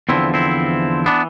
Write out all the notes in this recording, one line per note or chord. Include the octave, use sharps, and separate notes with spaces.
E2 D3 F3 C4 E4
C4 E4
E3 B3 D4